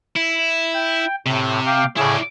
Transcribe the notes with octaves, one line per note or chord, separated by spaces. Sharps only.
E4
G5
A2 C3
F5 G5 D6
A2 C#3 E4 G#4 D5